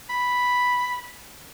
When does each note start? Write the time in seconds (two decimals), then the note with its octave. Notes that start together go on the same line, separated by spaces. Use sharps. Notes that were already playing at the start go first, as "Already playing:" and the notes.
0.10 B5